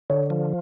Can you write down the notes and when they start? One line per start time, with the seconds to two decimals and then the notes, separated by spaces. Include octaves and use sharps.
0.10 D3 C#5
0.30 F3